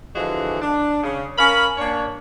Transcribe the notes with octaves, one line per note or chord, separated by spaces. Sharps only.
D3 E3 F3 G#3 F#4
D4
C#3
C#4 A#4 F5 B5
A#3 D4 C#5